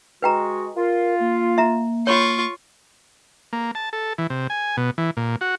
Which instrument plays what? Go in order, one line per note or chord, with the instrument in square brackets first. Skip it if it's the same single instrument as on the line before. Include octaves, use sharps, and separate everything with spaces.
[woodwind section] G#3 F#4 [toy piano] B4 G5 A#5
[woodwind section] F4 [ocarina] A#4
[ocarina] A#3
[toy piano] E5 A#5
[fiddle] F4 C#6 [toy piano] C#5 B5
[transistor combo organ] A#3
A5
A4
E3
C3
G#5
B2
E3
A#2
F#4